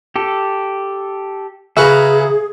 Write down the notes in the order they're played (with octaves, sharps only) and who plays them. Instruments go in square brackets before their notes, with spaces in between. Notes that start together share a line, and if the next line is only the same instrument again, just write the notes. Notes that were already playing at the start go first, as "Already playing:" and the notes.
[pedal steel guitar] G4 A4
[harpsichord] C#3 F#4 B4 [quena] G#4 [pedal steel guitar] E5 A#5